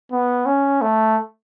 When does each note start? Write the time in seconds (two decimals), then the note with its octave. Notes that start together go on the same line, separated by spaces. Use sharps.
0.12 B3
0.46 C#4
0.81 A3